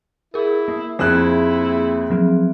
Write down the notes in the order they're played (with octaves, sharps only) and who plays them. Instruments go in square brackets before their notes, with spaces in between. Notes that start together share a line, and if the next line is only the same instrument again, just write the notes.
[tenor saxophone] E4 [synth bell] G#4 A#4
[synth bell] A#3
[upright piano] F2 C4 F#6 [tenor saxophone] E4 [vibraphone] G#4 E5 C6
[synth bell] F3 F#3 C4